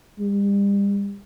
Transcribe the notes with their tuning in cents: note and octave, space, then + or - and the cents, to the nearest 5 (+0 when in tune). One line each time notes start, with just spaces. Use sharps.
G3 +40